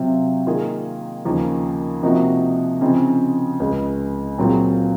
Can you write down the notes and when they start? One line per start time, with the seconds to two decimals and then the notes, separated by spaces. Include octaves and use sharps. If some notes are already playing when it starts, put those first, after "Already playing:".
Already playing: C3 F#3 C4 F4
0.47 D#3 A#3 F4 G#4
1.25 D#2 C#3 F3 A#3
2.03 C3 F3 A#3 D#4 F#4
2.81 C#3 F3 C4 D#4
3.60 C#2 C#3 G#3
4.38 A#2 F#3 C4 F4 G#4